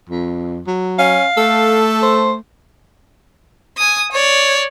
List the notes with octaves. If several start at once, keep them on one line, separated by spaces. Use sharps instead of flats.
F2
F#3
C#4 F5
A3 A4
C5
G#5 D#6
C#5 D5